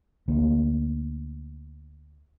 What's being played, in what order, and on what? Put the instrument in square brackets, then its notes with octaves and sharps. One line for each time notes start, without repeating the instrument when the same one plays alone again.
[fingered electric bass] D2 A#3